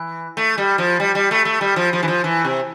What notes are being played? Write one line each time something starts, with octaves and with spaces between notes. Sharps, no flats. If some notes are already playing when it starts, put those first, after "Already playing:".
Already playing: E3
A3
G3
F3
G3
G3
A3
A3
G3
F3
F3
E3
F3
E3
C3